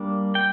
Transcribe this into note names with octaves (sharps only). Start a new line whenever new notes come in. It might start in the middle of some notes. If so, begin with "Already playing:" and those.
Already playing: G3 A#3 D4
G5